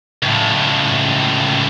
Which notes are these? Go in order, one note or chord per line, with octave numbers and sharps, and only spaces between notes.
C#2 A2